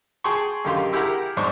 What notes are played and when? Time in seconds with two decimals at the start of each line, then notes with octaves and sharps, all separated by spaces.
0.24 G#4 G5 A5 C6 C#6
0.65 F#2 D3 D#3 G4 F5 C6
0.93 E4 G4 G#4 A#4 F#5 A#5
1.37 E2 G#2 D4 C5 C#6